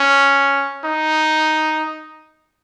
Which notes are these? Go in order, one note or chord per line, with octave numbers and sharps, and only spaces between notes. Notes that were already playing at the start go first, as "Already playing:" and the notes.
Already playing: C#4
D#4